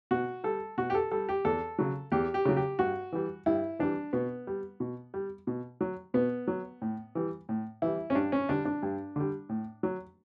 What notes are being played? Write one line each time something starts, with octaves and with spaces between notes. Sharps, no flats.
B2 F#4
G3 A4
B2 F#4
G4
A4
G3 A4
G4
E2 A4
C#3 F#3
E2 G4
G4
C#3 F#3
G4
G2 F#4
E3 G3
G2 E4
E3 G3 D4
B2 B3
G3
B2
G3
B2
F#3
B2 B3
F#3
A2
E3 G3
A2
E3 G3 E4
C#4
G2 D4
C#4
D3 G3 D4
D4
G2
D3 G3
A2
F#3